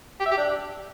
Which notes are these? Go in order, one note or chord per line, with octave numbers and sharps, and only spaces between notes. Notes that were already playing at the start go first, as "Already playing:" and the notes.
G4
E5
G4
D4